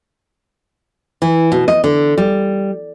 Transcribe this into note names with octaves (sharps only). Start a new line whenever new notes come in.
E3
B2
D#5
D3
G3